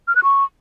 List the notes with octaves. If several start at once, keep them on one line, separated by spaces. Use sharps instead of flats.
F6
F#6
C#6